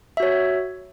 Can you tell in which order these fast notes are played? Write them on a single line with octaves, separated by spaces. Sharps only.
E5 F#4 C#5